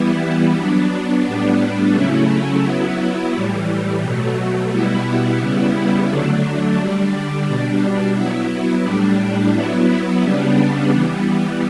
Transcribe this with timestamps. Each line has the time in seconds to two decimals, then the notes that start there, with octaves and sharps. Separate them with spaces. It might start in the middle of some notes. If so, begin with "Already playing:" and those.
Already playing: E3 G3 B3 E4
0.56 F#3 B3 D4
1.25 A2 G3 B3 D4
1.93 C#3 F#3 A3 C#4 E4
2.62 F#3 B3 E4
3.32 A2 E3 G3
4.01 B2 F#3 A3
4.69 B2 G3 B3 E4
5.39 C#3 G3 B3 E4
6.07 D3 F#3 A3 D4
6.76 D3 G3 D4
7.45 B2 G3 D4
8.14 F#3 B3 E4
8.83 A2 G3 D4
9.52 F#3 B3 E4
10.21 C#3 G3 B3 D4
10.90 E3 G3 B3